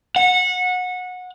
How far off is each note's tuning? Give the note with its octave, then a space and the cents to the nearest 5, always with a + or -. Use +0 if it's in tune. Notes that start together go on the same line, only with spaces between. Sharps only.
F#5 -25